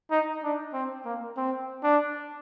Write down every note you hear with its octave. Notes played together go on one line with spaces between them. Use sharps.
D#4
D4
C4
A#3
C4
D4